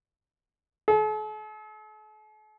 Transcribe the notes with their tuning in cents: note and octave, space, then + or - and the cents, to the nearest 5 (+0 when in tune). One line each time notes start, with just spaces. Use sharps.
A4 -45